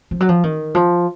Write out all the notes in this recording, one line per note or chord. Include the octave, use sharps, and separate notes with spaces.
F3
F#3
F3
D#3
F3